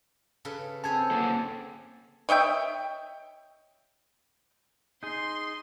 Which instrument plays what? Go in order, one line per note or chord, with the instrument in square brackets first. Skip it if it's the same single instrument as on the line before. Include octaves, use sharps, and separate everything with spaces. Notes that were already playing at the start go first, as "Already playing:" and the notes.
[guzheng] C#3 A4 B4
[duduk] C4 [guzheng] C#4 G#4 B4 [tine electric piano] A5 G#6
[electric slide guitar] A#3 A4 C5
[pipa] C#5 D#5 E5 G5
[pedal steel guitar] D#4 G#4 [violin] C6